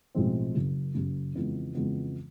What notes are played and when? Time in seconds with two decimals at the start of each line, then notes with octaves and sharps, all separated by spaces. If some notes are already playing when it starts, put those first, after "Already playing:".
0.15 B1 A2 F3 G#3 C4
0.55 F#1 F#2 C#3
0.94 F#1 F#2 C#3
1.35 F2 C#3 E3 G#3 B3
1.75 F2 C#3 E3 G#3 B3